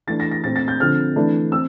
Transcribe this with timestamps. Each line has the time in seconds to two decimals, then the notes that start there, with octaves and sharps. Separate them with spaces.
0.07 E3 A3 D4 A6
0.20 A#6
0.31 A#6
0.44 A#2 A3 C4 A6
0.56 A6
0.68 G6
0.80 D3 F3 C4 F6
1.16 E3 A3 D4
1.52 C4 E6